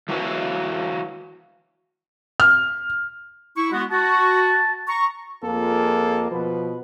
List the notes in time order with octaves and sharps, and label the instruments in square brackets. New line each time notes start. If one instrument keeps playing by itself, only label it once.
[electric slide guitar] E3 F#3 F#4 B4 C#5
[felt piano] F6
[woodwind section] E4 C#6
G#3 B3 F#4
[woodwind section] F#4 [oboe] A5
[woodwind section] A#5 C#6
[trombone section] F2 A#3 F4 G#4 A4
B2 F3 B4